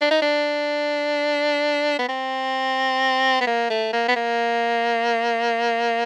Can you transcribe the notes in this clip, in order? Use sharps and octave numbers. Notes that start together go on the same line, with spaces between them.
D4
D#4
D4
B3
C4
B3
A#3
A3
A#3
B3
A#3